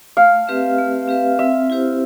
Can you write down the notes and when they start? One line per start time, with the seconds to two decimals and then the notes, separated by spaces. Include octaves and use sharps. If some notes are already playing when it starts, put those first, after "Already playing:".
0.17 A3 F5
0.47 C4 G4 B4 E5
0.78 A3
1.08 C4 G4 B4 E5
1.39 C4 E5
1.70 E4 G4 C5